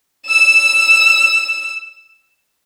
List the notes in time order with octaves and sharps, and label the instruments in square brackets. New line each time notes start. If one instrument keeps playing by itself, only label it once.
[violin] E6 E7